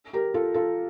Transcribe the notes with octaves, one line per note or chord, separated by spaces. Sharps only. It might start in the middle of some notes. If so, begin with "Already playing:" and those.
G4 A#4
F4 A4
F4 A4